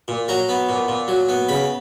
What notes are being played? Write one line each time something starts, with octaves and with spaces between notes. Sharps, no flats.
A#2
F#3 A#5
B3
A#2
A#2
F#3
B3
C#3 B5